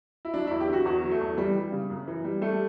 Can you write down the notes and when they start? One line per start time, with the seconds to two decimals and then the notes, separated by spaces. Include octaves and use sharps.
0.25 E4
0.34 F#3 D4
0.47 E2 E4
0.60 G4
0.69 D3 F#4
0.86 E2 F#4
1.03 F#3
1.11 A3
1.21 E2
1.37 E3 G3
1.56 G3
1.72 C#3
1.90 F#2
2.08 E3
2.24 G3
2.41 G3 A3